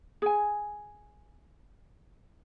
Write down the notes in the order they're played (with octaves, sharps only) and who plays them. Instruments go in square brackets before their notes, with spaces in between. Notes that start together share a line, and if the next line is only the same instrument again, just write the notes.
[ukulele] G#4 G#5